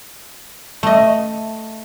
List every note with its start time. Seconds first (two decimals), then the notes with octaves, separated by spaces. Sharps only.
0.83 A3 D#5